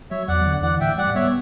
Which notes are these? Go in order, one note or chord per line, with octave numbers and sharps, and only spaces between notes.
F#3 C#5 E5
E2 D5 F#5
D3
E3 D5 F#5
A2 E5 G5
G3 D5 F#5
B3 C#5 E5